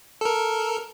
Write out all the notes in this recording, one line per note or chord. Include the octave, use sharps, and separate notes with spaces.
A4 A#4